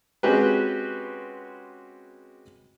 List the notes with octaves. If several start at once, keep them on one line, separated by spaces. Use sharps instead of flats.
G#3 C4 C#4 F#4 G4 B4